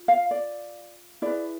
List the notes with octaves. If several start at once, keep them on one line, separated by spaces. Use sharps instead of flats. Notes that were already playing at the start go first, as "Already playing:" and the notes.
Already playing: F4
F5
D5
E4 G#4 B4 D5